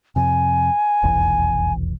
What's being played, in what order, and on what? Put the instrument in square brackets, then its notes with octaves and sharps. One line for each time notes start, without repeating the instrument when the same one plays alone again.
[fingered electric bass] F2 C3 [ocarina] G#5
[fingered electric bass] F1 B1 E2